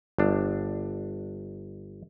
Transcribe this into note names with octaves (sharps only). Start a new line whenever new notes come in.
G1 D4